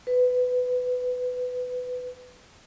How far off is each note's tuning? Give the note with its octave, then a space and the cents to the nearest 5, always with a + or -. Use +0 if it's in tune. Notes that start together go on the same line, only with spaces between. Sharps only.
B4 +15